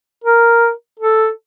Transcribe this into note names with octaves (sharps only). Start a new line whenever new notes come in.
A#4
A4